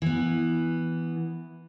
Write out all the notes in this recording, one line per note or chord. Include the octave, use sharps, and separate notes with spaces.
E3 B3